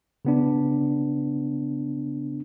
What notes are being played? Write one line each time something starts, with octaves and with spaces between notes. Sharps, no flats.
C#3 B3 D4